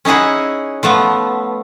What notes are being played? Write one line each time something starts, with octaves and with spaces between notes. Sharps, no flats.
C#4 D#4 E4 G#4 F#5
F3 A3 B3